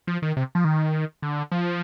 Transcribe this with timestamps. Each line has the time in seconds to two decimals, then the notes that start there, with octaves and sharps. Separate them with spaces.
0.07 F3
0.22 D#3
0.37 C3
0.55 F3
0.65 D#3
1.22 D3
1.52 F3